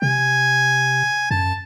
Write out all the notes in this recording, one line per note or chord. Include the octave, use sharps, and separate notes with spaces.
C3 G#5
F#2 A5